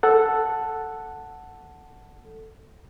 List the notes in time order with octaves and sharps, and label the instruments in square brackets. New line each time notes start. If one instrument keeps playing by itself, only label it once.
[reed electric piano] A4 F#5